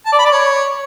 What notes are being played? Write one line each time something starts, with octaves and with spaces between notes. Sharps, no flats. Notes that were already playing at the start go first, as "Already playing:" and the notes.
A5
D5
B5
D5
C#5